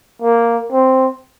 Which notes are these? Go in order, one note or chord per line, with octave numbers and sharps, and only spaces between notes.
A#3
C4